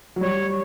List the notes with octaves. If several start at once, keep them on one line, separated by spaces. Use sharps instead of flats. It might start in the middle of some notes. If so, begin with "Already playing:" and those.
F#3
G3 C#5